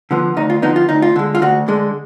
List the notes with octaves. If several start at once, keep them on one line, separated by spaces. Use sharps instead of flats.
D3 F3 B3
D2 D#4
F4
D3 F3 B3 D#4
F4
D2 D#4
F4
D3 G#3
F4
D2 F#4
D3 G#3